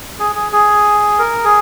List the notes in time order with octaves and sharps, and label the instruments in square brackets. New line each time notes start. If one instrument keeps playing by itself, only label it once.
[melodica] G#4
G#4
G#4
A#4
G#4